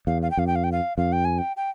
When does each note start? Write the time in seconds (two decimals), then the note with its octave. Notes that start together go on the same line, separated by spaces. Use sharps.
0.07 E2 F5
0.22 F5
0.31 G5
0.37 F2 F5
0.47 G5
0.56 F5
0.64 G5
0.72 F5
0.97 F2 F5
1.13 G5
1.25 G#5
1.38 G5
1.57 G5